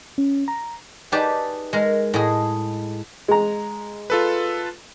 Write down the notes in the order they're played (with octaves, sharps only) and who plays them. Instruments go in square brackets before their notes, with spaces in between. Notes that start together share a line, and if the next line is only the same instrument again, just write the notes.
[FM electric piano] C#4
A#5
[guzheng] D#4 G4 G#4 B4 D5 A5
G#3 A#4
A2 G#3 G#4
[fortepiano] G#3 A#5
[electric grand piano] F4 A4 B4